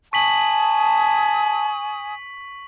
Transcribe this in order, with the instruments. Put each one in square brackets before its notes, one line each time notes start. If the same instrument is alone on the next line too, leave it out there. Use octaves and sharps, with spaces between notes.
[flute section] G#5 D#6 [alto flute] A5 [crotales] C#6 B6 F#7